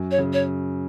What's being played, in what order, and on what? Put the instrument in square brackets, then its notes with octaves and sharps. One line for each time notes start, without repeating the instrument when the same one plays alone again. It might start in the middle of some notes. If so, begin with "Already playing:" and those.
Already playing: [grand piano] F#2
[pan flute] C#5
[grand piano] C#3
[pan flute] C#5